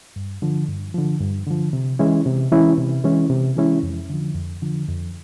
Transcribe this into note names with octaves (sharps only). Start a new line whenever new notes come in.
G2
D3 F3
G2
D3 F3
G2
D3 F3
C3
E3 G#3 C#4 E4
C3
E3 G#3 C#4 E4
C3
E3 G#3 C#4 E4
C3
E3 G#3 C#4 E4
F2
D3 F3
F2
D3 F3
F2